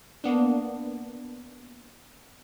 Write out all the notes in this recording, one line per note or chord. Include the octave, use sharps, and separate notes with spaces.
A#3 B3 D4